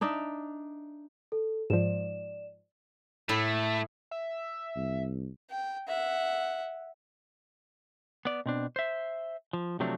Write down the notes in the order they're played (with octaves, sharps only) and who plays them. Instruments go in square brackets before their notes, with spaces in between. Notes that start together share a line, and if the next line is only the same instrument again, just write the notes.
[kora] D4 D#4 D5 E5
[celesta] A4
[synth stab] G#2 F3 [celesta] D5 E7
[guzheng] A2 E4 [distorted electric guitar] A3
[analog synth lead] E5
[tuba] C2
[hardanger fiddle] G5
E5 F#5
[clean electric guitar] B3 D5
B2 C4 D4
C5 E5
F3
C3 F3 F#3 A3 C4 D4